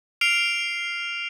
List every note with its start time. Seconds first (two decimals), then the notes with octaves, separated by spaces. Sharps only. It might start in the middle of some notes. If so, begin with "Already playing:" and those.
0.21 F6 C7 D7 F7